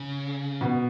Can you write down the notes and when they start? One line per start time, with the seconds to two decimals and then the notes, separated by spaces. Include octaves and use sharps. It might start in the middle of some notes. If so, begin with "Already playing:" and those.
Already playing: C#3
0.61 B2